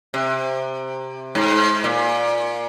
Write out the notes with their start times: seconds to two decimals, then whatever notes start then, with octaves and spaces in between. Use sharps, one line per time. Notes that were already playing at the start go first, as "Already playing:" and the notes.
0.14 C3
1.35 G#2
1.84 A#2